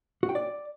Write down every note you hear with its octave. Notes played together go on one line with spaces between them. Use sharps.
F#4
G5
D5